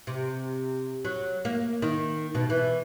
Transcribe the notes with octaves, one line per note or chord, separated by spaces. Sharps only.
C3
F#3
A#3
D#3
B2
E3